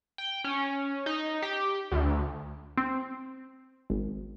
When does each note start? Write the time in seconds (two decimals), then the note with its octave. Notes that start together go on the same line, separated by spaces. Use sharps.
0.18 G5
0.44 C#4
1.06 D#4
1.42 G4
1.92 D2
2.77 C4
3.90 G#1